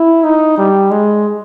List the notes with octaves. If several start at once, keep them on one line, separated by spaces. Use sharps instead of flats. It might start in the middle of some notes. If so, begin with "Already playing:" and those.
Already playing: E4
D#4
G3
G#3